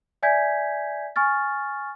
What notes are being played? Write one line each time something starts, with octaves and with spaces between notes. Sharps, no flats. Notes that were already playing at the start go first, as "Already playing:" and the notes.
D5 E5 G#5 G6 G#6 B6
G#5 C#6 F6 A6